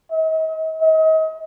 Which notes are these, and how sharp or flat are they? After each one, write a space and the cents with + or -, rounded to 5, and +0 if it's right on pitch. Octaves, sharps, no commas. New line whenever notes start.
D#5 +45
D#5 +35